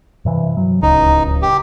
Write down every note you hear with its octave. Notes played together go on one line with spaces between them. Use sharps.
G2 C3 E3
F#3
D1 C#2 C#3 D#4
G4